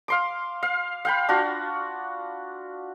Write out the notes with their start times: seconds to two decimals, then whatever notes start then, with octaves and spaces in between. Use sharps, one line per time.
0.08 F5 C6 D6
0.63 F5
1.05 F5 G5 B5
1.29 D4 F4 F#4